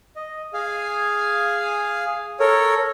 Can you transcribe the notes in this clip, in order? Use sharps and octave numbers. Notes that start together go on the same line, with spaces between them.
D#5
G#4 F5 G#5
A4 A#4 C#5